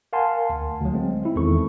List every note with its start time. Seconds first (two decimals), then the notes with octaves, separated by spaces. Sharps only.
0.13 A#4 F5 F#5 G#5 A5 C6
0.50 D2
0.81 D2 F#3
0.94 G#3 C4
1.22 C4 E4
1.36 E2 D#3 G#3 A4 C#6